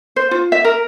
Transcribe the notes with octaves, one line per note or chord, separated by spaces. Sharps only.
C5
F4
E5
A#4